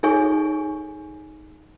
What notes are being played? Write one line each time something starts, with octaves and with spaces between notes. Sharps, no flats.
D#4 G#4 A4 C#5 G#5 C#6